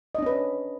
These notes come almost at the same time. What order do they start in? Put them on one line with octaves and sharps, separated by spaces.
D#5 D4 C#4 B4